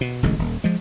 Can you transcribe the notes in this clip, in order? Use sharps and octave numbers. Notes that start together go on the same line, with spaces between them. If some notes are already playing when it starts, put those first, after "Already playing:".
B2
E1 A1 D3 G#3
D#1
F3 G#3